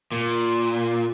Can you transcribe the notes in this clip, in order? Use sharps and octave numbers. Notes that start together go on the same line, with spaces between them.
A#2